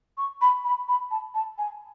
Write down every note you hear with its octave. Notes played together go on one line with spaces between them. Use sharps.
C#6
B5
B5
B5
A5
A5
G#5